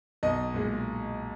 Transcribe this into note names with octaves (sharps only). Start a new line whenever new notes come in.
B1 D#5
A#2 G#3